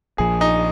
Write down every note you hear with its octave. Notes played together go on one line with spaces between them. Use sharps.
A#1 A#2 F3 G#4
D#4